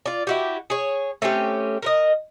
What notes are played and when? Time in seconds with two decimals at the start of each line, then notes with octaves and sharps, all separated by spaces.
0.06 F4 D5
0.27 E4 F#4 G4
0.70 G#4 C#5
1.22 A3 C4 C#4 G4
1.82 A#4 B4 D#5